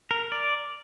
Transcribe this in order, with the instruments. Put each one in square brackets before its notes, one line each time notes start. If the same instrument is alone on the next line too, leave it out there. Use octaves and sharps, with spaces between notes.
[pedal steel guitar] A#4
D5